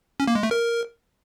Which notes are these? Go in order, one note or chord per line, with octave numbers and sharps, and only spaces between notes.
C#4
A#3
G#3
A3
A#4